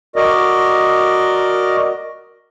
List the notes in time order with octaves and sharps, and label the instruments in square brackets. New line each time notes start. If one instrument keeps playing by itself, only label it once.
[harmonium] F#4 A#4 D5 D#5